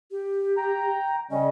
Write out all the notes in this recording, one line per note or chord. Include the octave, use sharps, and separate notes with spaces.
G4
G5 A#5
C#3 G3 C#4 D#5